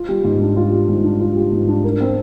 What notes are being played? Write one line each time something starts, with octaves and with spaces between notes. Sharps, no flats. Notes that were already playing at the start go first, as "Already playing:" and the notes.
Already playing: F4
G3
G#2
D4
F4
G3
G#2
D4
F4
G3
G#2
D4
A#4
C4